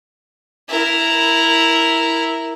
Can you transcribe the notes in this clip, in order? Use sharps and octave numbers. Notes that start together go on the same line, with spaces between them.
E4 A#4